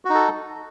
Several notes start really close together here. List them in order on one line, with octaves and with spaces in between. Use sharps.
F#4 D#4 A4